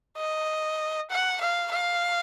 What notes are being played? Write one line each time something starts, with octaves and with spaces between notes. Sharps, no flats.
D#5
F#5
F5
F5